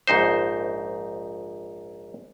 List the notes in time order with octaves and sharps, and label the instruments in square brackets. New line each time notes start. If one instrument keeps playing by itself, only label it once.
[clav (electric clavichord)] A#1 G#2 D#4 C5